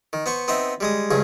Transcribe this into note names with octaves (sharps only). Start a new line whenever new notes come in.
D#3
B3 C5 C#6
B3 C4 D#4 E5
G3 G#3 D#6
C#2 G2 C#3 G#4